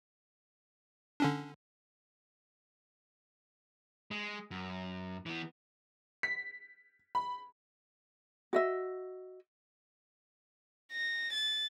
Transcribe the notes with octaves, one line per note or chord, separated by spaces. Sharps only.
D3 C#4 D4
G#3
F#2
E3 B3
B6
B5
F#4 D#5 E5
A#6
A6